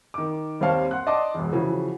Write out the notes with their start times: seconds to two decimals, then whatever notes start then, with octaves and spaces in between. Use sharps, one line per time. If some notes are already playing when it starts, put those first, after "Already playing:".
0.14 D#3 D6
0.61 D#2 G3 C4 C#5 F5 A5
0.91 F#5 C6 F#6
1.07 D5 D#5 A5 C6 D6
1.35 E1 E2
1.53 C#3 E3 F3 F#4